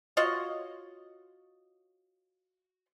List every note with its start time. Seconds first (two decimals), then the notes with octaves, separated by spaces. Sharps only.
0.17 F4 F#4 C#5 D#5